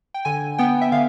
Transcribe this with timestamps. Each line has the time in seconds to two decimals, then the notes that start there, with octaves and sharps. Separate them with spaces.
0.14 G5
0.25 D3 G#5
0.58 B3 G5
0.81 E5
0.92 D3 F5